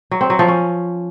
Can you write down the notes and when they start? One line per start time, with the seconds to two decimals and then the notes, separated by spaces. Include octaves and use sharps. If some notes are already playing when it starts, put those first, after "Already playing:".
0.11 F#3
0.21 C4
0.30 F#3
0.39 F3
0.48 C#4